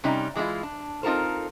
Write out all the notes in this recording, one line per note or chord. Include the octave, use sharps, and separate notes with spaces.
C3 G3 C#4 D#4 D5
E3 G#3 A3 C4 E4 F4
D4
C4 D#4 F4 A4 A#4 C5